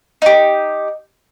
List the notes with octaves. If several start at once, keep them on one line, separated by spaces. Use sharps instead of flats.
D#4 G4